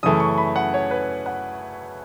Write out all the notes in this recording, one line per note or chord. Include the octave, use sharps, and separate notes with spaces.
F#2 C#3 E3 A3 D#6
C#6
B5
F#5
C#5
B4
F#5